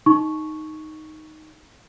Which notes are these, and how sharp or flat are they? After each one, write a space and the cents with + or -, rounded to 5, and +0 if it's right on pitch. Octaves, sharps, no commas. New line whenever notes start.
D#4 +0 C#6 +0